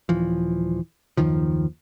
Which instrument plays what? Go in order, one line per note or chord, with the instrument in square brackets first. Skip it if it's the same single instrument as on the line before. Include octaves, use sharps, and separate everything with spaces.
[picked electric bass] D#1 E3 F3
F#1 D#2 D#3 F3